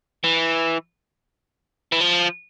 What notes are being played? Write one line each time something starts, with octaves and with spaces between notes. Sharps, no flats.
E3
E3
F3